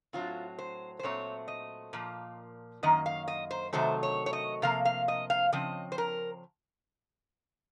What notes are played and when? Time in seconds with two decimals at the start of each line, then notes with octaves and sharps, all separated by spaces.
0.13 A2 F#3 C4 F4
0.59 C5
0.99 C5
1.03 A#2 F#3 A3 C4 C#5
1.48 D#5
1.93 A#2 F3 A#3
2.83 F#2 D#3 A#3 D#5
3.06 F5
3.28 D#5
3.51 C5
3.73 C3 D#3 F#3 A3 C5
4.03 C#5
4.26 C#5
4.33 D#5
4.62 C3 F3 A#3 F5
4.85 F5
5.08 D#5
5.30 F5
5.52 C#3 F3 C4 D#5
5.92 C5
5.98 A#4